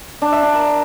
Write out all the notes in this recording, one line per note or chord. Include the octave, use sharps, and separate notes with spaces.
D4
E5
D4
A#4